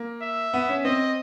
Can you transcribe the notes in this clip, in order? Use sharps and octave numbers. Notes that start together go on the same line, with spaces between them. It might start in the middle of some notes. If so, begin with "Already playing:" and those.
Already playing: A#3
E5
B3
C#4
C4 D#5